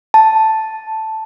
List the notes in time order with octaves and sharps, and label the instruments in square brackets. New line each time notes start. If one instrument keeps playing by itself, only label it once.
[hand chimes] A5